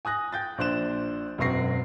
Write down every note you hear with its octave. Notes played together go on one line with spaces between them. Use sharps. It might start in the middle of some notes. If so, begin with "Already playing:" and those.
G#5 D#6 F#6 A#6
G5 G6 A6
A#1 D4 C5 F#6 E7
E1 F#2 C4 C#6 A#6 C7